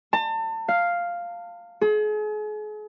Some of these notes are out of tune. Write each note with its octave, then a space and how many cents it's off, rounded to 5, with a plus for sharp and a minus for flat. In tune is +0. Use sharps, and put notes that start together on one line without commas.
A5 +35
F5 +0
G#4 +40